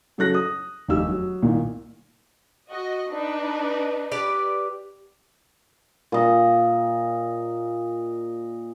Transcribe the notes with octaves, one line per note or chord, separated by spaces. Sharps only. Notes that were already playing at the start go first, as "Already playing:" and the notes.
C#3 F#3 A4 F#6 A#6
D#6
F1 D#2 G4 E6
F#3
C2 A#2 D#3
F#4 D#5
D4 D#4 B4
G4 B4 D5
A#2 D#5